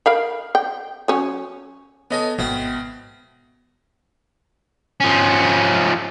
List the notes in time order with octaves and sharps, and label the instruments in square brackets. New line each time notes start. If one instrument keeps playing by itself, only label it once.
[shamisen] A#4 F5 B5
G5
F#3 C#4
[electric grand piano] B3 D#5 A#6 [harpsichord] C#4 A4 G#5
[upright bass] G#1 [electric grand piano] B2 [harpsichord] B3 C4 E5
[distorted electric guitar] F3 C#4